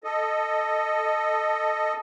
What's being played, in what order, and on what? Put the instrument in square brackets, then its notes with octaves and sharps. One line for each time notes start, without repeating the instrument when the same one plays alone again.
[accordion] A4 D#5